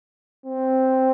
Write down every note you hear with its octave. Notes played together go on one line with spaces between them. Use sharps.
C4